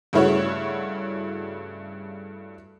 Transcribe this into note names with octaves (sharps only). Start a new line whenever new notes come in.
G2 C#3 A3 E4 F#4 C#5